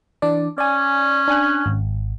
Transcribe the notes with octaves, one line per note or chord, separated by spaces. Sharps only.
E3 D4 D5
C#4 D5 G#5
D4 G#5 F#6
G#1